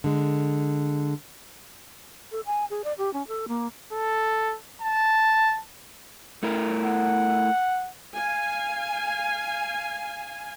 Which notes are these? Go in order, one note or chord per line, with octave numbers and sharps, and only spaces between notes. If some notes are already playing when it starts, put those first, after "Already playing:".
D3 G#3
A4
G#5
G#4
D5
G4
C#4
A4
A#3
A4
A5
A3 E4 A#4
F#5
F5 G#5